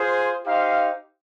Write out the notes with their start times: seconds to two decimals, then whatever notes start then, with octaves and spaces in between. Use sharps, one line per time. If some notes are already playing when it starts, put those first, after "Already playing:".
Already playing: F4 G#4 C5
0.45 D#4 G4 C5 F5